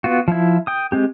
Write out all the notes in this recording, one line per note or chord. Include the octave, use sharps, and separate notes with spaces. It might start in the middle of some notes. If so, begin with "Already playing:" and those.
B3 F4 F#4
F3 E4
G5 D#6
G#3 C4 G4